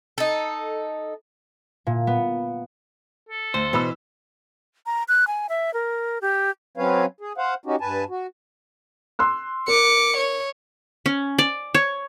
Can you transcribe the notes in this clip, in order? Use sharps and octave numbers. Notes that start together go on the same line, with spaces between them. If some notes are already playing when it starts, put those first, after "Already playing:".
D#4 A4
A#2
B3
A4
D2 C5
B2 E3 B4 E6
A#5
F#6
G#5
E5
A#4
G4
F#3 C4 C#4 B4 C#5 F5
G#4
C5 F5 F#5
C#4 D#4 F#4 G4
G2 B4 G#5 A5
F#4
C6 E6 F#6
A#4 D6 C#7
C#5
C#4
D5
C#5